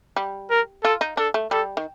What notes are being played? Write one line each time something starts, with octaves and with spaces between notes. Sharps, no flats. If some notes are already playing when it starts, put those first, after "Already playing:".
G3
A#4
F4 A4
D#4
D4 A4
A3
G3 A4
D#3